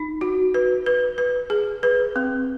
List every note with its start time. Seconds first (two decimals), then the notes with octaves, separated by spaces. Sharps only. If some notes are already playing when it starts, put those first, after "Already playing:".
Already playing: D#4
0.21 F#4
0.54 B4
0.86 B4
1.18 B4
1.50 G#4
1.83 B4
2.16 C4